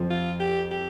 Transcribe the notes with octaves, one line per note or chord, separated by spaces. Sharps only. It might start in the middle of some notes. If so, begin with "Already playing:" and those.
Already playing: F2 F3
F4
G4
G4